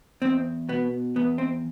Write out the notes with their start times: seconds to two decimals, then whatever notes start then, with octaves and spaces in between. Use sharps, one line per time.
0.22 E2 C4
0.69 B2 B3
1.16 E2 B3
1.38 C4